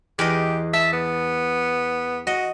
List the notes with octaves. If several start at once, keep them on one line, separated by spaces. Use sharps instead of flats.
E2 G4 B4 D#5
E5 A5
B3
F#4 D#5